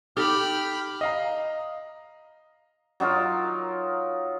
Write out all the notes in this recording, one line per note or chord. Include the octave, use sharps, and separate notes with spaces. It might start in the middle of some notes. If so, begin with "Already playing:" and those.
D#4 G4 A4 G5 B5 F6
D#5 F5 A#5
F#3 D#4 F4 A#4